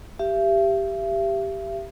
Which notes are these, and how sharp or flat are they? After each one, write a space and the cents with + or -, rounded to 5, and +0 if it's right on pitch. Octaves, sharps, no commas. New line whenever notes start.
G4 +0 E5 +40